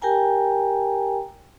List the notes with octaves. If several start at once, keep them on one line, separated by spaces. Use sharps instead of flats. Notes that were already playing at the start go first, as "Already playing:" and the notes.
G4 A#4 G5 G#5 A#5